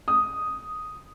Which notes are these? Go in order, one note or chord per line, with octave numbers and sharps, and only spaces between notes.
D#6